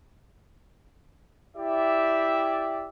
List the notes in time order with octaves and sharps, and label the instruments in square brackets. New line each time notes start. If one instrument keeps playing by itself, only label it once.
[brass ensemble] E4 G4 D5 E5